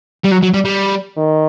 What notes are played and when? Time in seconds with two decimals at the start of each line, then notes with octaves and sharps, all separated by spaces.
0.24 G3
0.31 F#3
0.42 F#3
0.53 G3
0.65 G3
1.18 D#3